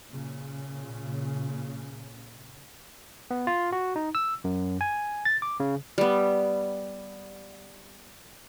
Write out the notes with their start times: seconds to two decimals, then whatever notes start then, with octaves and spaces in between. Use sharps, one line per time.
0.10 A#2 C#3
3.31 B3
3.47 F4
3.72 F#4
3.96 D#4
4.15 E6
4.44 F#2
4.81 G#5
5.25 A6
5.42 D6
5.60 C#3
5.98 G3 B3